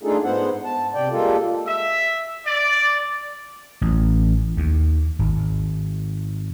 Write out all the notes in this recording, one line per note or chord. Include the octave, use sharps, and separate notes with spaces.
A3 D4 D#4 F4 G#4 A4
G#2 G#3 B3 C5 F#5
A5
C3 D5 G5
G3 G#3 A#3 F4 A4
E5
D5
A1
D#2
G#1